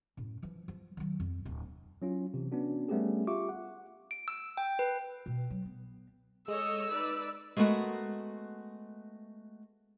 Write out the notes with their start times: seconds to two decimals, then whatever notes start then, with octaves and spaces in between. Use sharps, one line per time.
0.17 F#2 A2
0.42 E3 F3
0.68 F3
0.97 D#3 F#3
1.20 F2
1.45 D1
2.02 F#3 C#4 F4
2.34 C3 E3
2.52 B3 C#4 D4 F#4
2.88 G3 A3 B3 C#4 G4 G#4
3.27 F4 G4 E5 C#6 D6
3.49 F#5
4.11 D7
4.28 E6
4.57 G5
4.79 B4
5.26 B2
5.50 F#3
5.66 B3
6.48 G#3 A4 C#5 D#5 E6
6.91 D#4 B4 D5
7.56 G#3 A3 B3 C#4 F#4 A#4